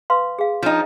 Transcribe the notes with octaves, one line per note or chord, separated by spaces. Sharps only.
B4 F5 C6
G#4 F5
F3 D4 D#4 C#5